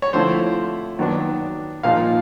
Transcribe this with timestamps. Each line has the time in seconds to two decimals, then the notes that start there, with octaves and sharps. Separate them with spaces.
0.02 C#5
0.13 D3 F3 A3 C4 E4 C5
0.99 D#3 F#3 B3 D4
1.83 A#2 F3 A#3 D#4 F5